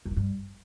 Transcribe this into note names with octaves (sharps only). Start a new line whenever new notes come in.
F#2
E3
G2